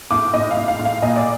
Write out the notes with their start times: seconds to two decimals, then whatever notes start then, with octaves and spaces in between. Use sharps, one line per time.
0.11 A2 D6
0.34 A2 D#5
0.51 F5
0.57 A2
0.68 F5
0.79 A2
0.85 F5
1.02 A#2 D#5
1.16 D5